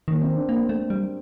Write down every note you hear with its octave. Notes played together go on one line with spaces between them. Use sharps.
D#3 A#3
C4
D4
A#3 D4
A3
G3